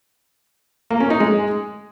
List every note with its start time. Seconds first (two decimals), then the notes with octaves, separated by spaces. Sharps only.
0.90 A#3
1.00 C#4
1.10 D#4
1.20 G#3